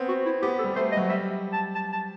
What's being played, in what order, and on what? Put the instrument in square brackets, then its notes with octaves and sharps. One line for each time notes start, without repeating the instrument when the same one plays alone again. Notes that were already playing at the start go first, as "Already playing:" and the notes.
Already playing: [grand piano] B3 C4
[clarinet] F#4
E4
[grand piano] B3 [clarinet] G4
[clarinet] A4
[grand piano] G3
[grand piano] A3 [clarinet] C5
[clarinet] D#5
[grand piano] F#3
[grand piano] G3 [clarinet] E5
[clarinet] A5
A5
A5